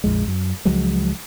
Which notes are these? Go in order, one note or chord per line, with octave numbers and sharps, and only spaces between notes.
A#1 F2 G#3
F#2
C#2 F3 F#3 G#3